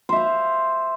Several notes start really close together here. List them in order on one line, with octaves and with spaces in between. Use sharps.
C5 E5 F5